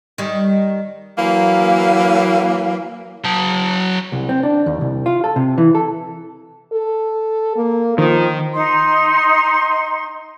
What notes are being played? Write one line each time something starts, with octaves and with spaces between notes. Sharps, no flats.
D#3 G3
E3 F#3 A#3
F#3 A5
C2
C4
D4
D#2
C2
F4
A4
C3
E3
A4
A4
A#3
D#3 F3
D#4 C6